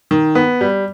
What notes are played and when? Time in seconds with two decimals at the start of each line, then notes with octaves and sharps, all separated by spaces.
0.11 D#3
0.35 B3
0.61 G3